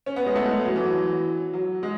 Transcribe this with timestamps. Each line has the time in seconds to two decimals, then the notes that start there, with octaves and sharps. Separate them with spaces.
0.06 C#4
0.16 B3
0.26 G#3
0.35 A3
0.45 G#3
0.65 F#3
0.76 E3
0.85 F#3
1.53 F#3
1.83 G#3